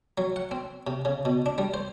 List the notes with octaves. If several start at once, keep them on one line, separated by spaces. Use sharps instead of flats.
F#3
F#5
C4
C3
C#3
B2
D4
G3
C5